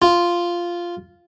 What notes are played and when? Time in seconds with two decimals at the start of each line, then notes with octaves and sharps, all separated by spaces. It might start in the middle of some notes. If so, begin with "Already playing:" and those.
0.02 F4